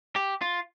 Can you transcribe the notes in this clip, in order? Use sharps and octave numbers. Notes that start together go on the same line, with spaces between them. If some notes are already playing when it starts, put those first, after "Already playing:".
G4
F4